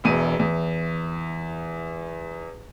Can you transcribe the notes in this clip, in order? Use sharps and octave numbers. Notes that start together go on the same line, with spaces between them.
E1 E2 D#7
E2